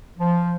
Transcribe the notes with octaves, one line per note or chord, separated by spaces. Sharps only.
F3